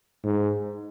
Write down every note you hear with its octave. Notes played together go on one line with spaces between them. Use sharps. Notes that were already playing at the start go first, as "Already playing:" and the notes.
G#2